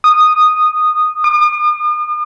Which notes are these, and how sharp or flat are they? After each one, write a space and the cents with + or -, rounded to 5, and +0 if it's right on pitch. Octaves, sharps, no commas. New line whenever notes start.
D#6 -10
D#6 -45